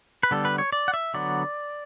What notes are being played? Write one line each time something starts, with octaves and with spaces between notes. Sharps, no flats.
B4
D3 G3 B3 A4
B4
C#5
D5
F#5
E5
D3 F#3 B3 D5